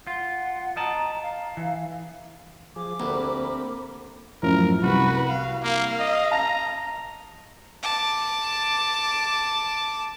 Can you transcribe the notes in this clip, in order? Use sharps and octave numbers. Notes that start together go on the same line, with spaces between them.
F4 F#5
D#5 A5 A#5
F5
E3
F3 G#4 D6
D2 A#3 C4 G4 A#4 F#5 B5
F#2 A2 F3 A#4
C2 F#4 B4
F5
A#3 F5
D#5
A5 A#5 A#6
A5 D6